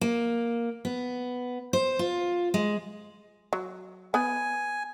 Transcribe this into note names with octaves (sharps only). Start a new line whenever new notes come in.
A#3
B3
C5
F4
G#3
F#3
B3 G#5 B5